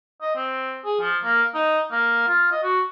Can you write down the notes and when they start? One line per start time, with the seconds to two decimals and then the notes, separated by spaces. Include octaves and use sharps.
0.21 D#5
0.36 C4
0.85 G#4
1.01 F3
1.23 A#3
1.54 D#4
1.91 A#3
2.28 F4
2.52 D#5
2.63 F#4